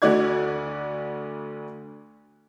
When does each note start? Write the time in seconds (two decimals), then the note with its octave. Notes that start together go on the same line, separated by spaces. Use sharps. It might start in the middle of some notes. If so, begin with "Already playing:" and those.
0.02 D2 D3 F#4 D5 G#6